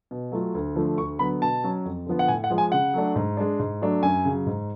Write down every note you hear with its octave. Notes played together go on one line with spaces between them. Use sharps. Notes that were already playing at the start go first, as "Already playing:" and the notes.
B2
F#3 A3 F4
D2
D3 F3 A3
D2 C#6
D3 F#3 B3 B5
B2 A5
F#3 C#4
F2
D3 F3 B3
F#5
A2 G#5
F#5
F3 G#3
G#5
C#3 F#5
F#3 A3 D4
G#2
G#3 D4
G#2
F#3 A3 D4
F#2 G#5
C#3 F#3
G#2